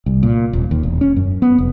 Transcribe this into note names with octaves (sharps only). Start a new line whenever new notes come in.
C2
A#2
D#1
D#2
E1
C#4
F#2
B3
F1